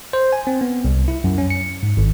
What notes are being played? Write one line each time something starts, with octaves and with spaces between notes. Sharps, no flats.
C5
G#5
C4
B3
C2
E4
F#2
C#4
C#7
G#2
G#1